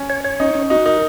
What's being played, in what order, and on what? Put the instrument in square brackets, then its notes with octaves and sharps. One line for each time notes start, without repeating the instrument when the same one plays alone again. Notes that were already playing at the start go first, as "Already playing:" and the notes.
Already playing: [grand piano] C#4
[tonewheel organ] C#5
C#5
[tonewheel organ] C#4 [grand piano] D#4
[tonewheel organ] C#4
[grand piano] D#4 [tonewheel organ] F#4
[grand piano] D#4 [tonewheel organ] A#4